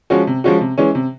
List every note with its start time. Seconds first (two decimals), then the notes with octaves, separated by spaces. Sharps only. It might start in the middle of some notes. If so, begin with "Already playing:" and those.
0.10 F3 G#3 C#4 F#4
0.27 C3
0.44 F3 G#3 C#4 F#4
0.61 C3
0.78 E3 G#3 C#4
0.95 C3